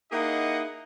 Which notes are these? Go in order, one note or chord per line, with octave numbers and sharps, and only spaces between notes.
A#3 D#4 E4 G#4 D#5 F#5